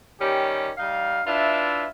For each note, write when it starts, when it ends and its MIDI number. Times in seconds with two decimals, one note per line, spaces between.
0.20 0.70 51
0.20 0.70 55
0.20 0.70 61
0.20 0.70 67
0.78 1.21 55
0.78 1.21 63
0.78 1.21 77
1.26 1.86 62
1.26 1.86 64
1.26 1.86 65
1.26 1.86 71
1.26 1.86 76